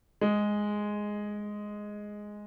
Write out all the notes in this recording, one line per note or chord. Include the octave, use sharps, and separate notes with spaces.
G#3